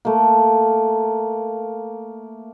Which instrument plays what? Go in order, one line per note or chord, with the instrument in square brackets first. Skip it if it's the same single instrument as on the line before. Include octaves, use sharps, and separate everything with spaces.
[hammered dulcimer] A3 A#3